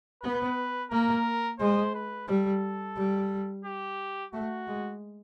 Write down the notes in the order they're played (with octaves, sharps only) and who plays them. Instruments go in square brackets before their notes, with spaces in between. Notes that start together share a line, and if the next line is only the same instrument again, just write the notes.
[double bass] B3 [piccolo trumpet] B4
[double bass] A#3 [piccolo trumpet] A#4
[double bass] G#3 [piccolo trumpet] C5
[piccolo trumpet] B4
[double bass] G3 [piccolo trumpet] A4
[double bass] G3
[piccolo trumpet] G4
[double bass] A3 [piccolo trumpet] F#4
[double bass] G#3